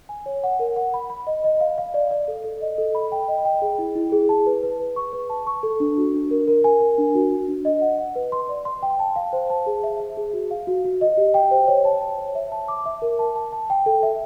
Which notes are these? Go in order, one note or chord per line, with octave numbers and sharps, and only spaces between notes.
G#5
C#5
F#5
A#4
F#5
B5
B5
D#5
D#5
F5
F5
D5
D5
A4
A4
D#5
A4
B5
G5
D#5
G5
G#4
E4
E4
G#4
A5
B4
B4
B4
C#6
B4
A5
C#6
A4
D4
F#4
D4
A#4
A#4
G#5
A#4
D4
F#4
F#4
D4
D#5
F#5
F#5
B4
C6
D5
C6
G5
A5
F5
C5
A5
G#4
E5
E5
G#4
F#4
F5
F#4
F#4
D#5
G4
G5
C5
C#5
A5
A5
C#5
E5
A5
D6
E5
A#4
A5
A5
A5
G5
A4
E5